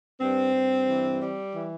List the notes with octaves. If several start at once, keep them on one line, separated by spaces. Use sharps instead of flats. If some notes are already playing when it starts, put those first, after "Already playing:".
G2 C4
G2
E3
G3
E3